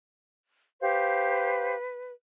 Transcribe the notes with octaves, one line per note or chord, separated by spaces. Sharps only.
G4 B4 C5 F5